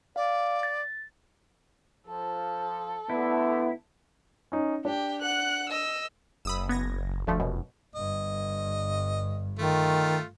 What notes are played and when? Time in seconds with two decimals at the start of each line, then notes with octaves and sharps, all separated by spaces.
0.16 D5 F5
0.63 A6
2.08 F3 A4
3.10 D3 A3 B3 E4
4.52 C#4 D#4
4.85 D4 G4 G5
5.21 F#5 F#6
5.69 D#5 E6
6.45 F#1 B5 D#6 E6
6.69 B3 G#6 A#6
7.27 F1 D2 F3 A3
7.40 F#2 B2
7.95 G1 G2 D#5
9.59 D#3 A3 F4